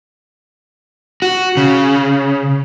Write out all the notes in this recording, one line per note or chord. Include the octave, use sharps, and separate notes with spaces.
F#4
C#3